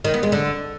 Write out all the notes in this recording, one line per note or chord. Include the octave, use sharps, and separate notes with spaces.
D#3
B3
G#3
D3